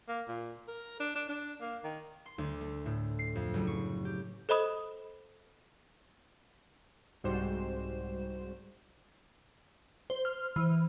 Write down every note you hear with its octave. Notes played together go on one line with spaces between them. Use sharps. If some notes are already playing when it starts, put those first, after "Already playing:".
A#3
A#2
A#4
D4
D4
D4
A#3
D#3
C6
D2
A3
A2
C7
F2
F#1
C#6
G4
A4 C5 D#5 B5 D#6
C2 G#2 G3 F#4 C5 E7
C5
F6
E3